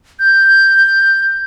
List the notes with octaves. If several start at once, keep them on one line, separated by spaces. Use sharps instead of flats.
G6